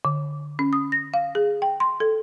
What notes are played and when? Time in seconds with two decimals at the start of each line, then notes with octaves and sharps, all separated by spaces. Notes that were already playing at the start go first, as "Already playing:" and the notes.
0.05 D3
0.59 C#4
0.73 D#6
0.92 A#6
1.14 F5
1.35 G#4
1.62 G5
1.80 C6
2.00 A4